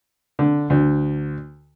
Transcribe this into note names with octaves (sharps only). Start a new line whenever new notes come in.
D3
D2